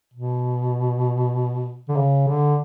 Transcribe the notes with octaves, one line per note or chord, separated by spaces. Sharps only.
B2
D3
C#3
D3